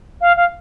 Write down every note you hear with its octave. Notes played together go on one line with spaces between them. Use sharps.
F5
F5